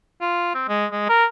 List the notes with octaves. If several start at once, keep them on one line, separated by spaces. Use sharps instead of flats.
F4
C4
G#3
G#3
A#4